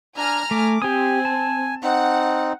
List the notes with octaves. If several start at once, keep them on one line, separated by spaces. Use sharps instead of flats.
D4 G#5 A#5 F6
A3 D6
C4 G4 G#5 D#6
A5
C4 D#4 F#5